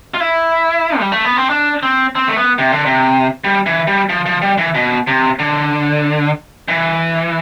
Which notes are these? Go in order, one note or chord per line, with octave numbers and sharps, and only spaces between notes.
F4
E4
G3
A3
B3
C4
D4
C4
C4
A3
B3
C3
D3
C3
G3
E3
G3
F3
F3
G3
E3
B2
C3
D3
E3